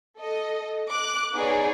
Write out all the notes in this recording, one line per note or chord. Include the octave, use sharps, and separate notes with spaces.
A4 D#5
D6 F#6
B3 D#4 G#4 C#5 D5